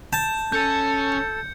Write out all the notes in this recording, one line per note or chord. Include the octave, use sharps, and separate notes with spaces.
A5 G6
C#4 A4 G6 C#7